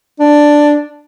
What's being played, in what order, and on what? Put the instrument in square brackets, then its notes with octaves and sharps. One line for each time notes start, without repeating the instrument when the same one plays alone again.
[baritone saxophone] D4